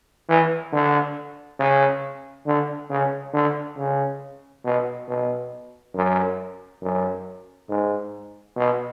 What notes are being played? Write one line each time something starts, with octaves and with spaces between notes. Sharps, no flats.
E3
D3
C#3
D3
C#3
D3
C#3
B2
B2
F#2
F#2
G#2
B2